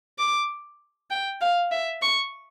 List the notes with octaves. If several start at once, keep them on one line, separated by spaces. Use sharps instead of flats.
D6
G5
F5
E5
C#6